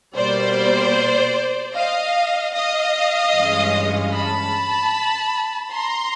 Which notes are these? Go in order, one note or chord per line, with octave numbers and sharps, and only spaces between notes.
B2 G3 A#3 C5 D5
D#5 F5
D#5 F5
G2 E3 G#3 C#4
A5 B5
A#5 C6